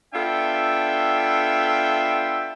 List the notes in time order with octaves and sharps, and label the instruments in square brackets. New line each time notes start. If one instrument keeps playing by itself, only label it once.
[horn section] B3 D4 F4 A4 E5 G5